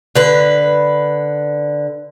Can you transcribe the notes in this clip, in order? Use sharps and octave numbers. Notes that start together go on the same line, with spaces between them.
D3 B4